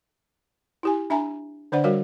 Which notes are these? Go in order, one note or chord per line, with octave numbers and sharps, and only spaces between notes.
E4 G4 G#5
D4 E5 G#5 A#5
D3 D4 C5 D5 F#5
G3 F#4 A#4 C#5 F5